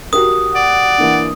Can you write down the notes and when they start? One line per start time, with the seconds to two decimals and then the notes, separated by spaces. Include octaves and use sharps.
0.13 F#4 G4 A#4 D#6
0.55 D5 F#5
0.98 E3 A#3 D4